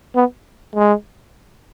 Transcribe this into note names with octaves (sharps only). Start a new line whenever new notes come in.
B3
G#3